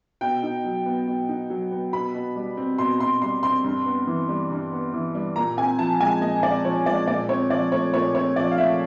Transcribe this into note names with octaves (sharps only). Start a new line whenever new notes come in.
B2 G5
D#4
F#3
B3
B2
D#4
F#3
B3
B2 B5
B2
G3
C4
B2 C6
B2 C6
G3 C6
C4 C6
G2
B3
E3
G3
G2
B3
E3
G3
A#2 A#5
C4 G#5
F3 A5
G#3 G#5
A#2 D#5
C4 D5
F3 C#5
G#3 D5
A#2 D5
C4 C#5
F3 D5
A3 C#5
A#2 C#5
C4 C#5
F3 D5
F5
A3 E5